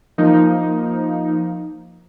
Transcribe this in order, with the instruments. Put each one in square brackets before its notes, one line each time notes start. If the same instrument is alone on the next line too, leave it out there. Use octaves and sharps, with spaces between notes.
[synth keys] F3 A#3 D#4